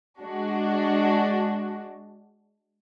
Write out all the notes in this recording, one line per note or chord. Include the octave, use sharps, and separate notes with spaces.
G#3 D4 F#4